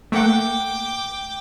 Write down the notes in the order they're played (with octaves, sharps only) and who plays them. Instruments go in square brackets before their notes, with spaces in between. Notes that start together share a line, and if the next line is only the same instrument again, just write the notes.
[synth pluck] A3 A#3 F#5 [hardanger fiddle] G5 D6